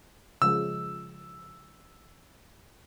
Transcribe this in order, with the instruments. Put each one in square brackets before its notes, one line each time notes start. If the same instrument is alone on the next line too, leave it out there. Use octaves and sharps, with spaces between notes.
[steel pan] C#3 F3 G#3 [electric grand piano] E6